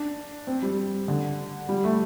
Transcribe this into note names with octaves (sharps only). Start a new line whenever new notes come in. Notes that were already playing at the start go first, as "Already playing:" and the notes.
Already playing: D4
C4
G3
D3
G3
A3